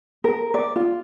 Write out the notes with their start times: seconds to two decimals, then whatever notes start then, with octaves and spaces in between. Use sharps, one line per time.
0.24 A#4
0.54 D5
0.76 F4